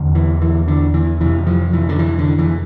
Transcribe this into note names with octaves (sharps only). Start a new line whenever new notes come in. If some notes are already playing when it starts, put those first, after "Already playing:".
Already playing: E2 D3
E3
E3
D3
E3
F2 C3 E3
F3
E3
D3
E3
D3
E3